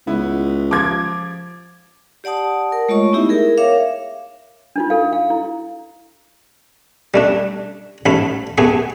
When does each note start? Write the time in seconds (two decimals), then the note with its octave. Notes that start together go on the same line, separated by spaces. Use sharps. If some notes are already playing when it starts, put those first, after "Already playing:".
0.07 C#2 B3 E4
0.71 F3 D6 G#6
2.24 G4 D5 F#5 A5 D#6
2.72 A#4
2.89 G#3 A3 F4 C#5 D#5 C#6
3.12 B3 D#4 E4 G4 E5
3.29 G#4 A#4
3.57 A#4 C#5 E5 F5 D6
4.76 D4 D#4 F4
4.90 A4 F5
5.13 F5
5.30 E4
7.14 G3 A3 D4
8.06 A1 G#2 A3 B5
8.58 A3 B3 G4 G#4